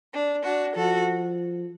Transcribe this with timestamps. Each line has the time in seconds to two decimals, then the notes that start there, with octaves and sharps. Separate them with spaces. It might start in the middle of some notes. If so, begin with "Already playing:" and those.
0.12 D4
0.44 D4 F#4
0.76 F3 F#4 A4